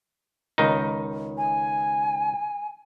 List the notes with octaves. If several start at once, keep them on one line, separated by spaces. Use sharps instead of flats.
C#2 D#3 D#4
G#5